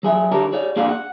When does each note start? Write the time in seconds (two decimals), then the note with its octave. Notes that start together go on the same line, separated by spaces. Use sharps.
0.03 F#3 G#4 E5
0.32 D3 G4 A#4 C#5 A5
0.52 G#4 C#5 D5
0.76 A#3 D4 G#4 A4 D5 F5
0.89 F#5